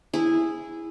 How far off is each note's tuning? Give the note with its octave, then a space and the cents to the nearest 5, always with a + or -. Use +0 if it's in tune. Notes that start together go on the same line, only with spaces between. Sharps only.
E4 +0 G#4 -10